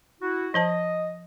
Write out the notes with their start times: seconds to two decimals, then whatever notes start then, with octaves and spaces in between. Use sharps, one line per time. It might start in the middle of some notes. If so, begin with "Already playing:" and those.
0.21 E4 F#4
0.54 F3 C5 D#5 A5